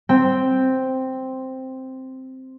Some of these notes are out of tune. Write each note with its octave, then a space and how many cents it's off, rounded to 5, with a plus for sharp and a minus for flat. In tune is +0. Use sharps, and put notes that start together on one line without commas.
C4 +0 G5 +0